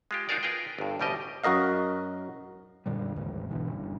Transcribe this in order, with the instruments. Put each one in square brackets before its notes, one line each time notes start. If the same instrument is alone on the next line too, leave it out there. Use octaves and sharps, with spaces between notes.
[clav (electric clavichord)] G#3 F4 G4
D#4 F4 F#4 G#4 A#4 D5
F4 G#4 A#4 B4 G5
G1 G2
A1 D2 B2 G3 G4 D#5
F#2 F#4 A#4 D#5 F5
[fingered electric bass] F2 A#2 D3 G3
A1 D#2 G#2 G#3
B1 B2 D3 E3
F#1 G2